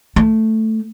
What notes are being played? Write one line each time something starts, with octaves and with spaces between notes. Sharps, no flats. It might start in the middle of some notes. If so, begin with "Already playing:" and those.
A3